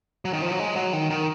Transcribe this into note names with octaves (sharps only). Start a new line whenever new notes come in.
F#3
D#3
F3
F#3
G#3
F#3
D#3
D#3